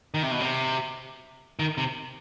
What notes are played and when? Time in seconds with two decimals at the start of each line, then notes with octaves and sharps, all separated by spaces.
0.14 D#3
0.23 C3
0.31 B2
0.40 C3
1.59 D#3
1.78 C3